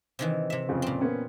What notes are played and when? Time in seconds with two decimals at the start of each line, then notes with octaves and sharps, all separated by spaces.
0.19 C3 D#3 E3
0.50 C3 E5
0.69 F2 C#3
0.82 A#2 C4
1.01 A#3 B3 C#4